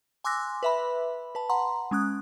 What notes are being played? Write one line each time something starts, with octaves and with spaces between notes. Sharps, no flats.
G#5 C6 D6 E6 F#6 A#6
B4 E5 B5
B4 A5
F#5 A#5 C6
G#3 C#4 D#6 F#6